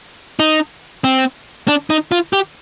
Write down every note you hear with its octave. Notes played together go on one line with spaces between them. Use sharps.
D#4
C4
D4
D#4
F4
G4